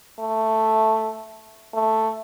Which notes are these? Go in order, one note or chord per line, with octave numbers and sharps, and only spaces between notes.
A3
A3